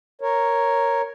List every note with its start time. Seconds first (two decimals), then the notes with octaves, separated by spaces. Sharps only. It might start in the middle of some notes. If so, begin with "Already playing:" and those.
0.21 A#4 C#5